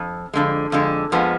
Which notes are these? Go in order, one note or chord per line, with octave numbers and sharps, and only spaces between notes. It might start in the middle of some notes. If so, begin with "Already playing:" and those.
Already playing: F2
F2 D3 G#3
F2 D3 G#3
F2 F3 G#3 B3